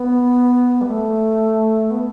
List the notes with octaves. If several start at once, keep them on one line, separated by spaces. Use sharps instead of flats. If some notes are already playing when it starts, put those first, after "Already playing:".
Already playing: B3
G3
A3
B3